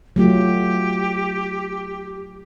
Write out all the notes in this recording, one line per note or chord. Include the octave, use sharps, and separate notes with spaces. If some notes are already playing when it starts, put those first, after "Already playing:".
F#3 A3 F4 G4